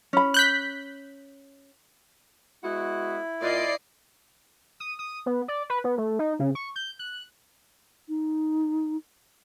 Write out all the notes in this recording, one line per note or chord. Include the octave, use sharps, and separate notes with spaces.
C#4 B5
F#6 G6 B6
G#3 B3 E4 F#4
A#2 D5 D#5 C7
D#6
D#6
B3
D5
B4
B3
A3
D#4
C#3
C#6
G6
F#6
D#4